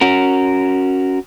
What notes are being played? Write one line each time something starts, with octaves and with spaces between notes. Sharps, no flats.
C#4 F#4 A#4